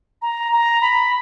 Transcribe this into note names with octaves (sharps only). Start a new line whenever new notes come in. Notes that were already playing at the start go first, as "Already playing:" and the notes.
A#5
A#5
B5